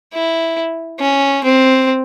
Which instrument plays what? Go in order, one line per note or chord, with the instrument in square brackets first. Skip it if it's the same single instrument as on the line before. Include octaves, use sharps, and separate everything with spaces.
[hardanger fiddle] E4
C#4
C4